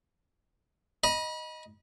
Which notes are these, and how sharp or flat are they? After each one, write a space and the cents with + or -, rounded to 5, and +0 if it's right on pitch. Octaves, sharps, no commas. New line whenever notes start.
D#5 +0 B5 -35